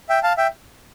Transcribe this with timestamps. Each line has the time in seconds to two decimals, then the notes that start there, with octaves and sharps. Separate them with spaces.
0.09 E5 G5
0.23 F5 A5
0.38 E5 G5